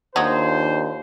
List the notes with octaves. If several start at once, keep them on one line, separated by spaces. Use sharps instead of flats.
D#2 F#3 D4 F4 C5 D#5